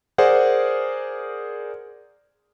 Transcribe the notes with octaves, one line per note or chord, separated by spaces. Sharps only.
G#4 A#4 C5 D5 F#5